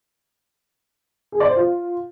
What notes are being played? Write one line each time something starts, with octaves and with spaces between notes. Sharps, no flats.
G#4
D5
C5
F4